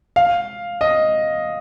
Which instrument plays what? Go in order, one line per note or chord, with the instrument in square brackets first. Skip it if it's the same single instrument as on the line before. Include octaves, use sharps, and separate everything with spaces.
[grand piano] F5
D#5